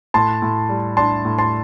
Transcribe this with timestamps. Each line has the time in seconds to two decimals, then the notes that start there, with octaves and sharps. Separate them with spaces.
0.14 A2 A5 C6
0.42 A2
0.69 G3
0.97 D4 A5 C6
1.25 A2
1.38 A5 C6